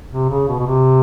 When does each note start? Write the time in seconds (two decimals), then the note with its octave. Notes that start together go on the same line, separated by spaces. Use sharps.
0.12 C3
0.30 C#3
0.48 B2
0.60 B2
0.66 C3